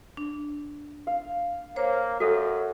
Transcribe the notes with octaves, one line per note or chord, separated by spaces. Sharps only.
D4
F5
A#3 C5 C#5
F#2 F#4 A4 E5